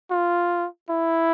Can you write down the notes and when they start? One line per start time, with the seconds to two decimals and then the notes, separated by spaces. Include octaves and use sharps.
0.11 F4
0.90 E4